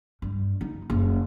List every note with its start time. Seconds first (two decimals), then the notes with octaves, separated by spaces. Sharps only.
0.22 G2
0.61 D#4
0.90 F#1